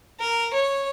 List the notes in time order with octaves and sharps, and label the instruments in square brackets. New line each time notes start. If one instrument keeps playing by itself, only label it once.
[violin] A#4
C#5